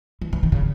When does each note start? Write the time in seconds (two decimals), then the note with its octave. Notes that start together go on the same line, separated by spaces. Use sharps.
0.21 E3
0.33 E3
0.43 D#3
0.52 C#3